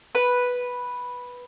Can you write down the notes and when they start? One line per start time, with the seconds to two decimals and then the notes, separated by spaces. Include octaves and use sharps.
0.15 B4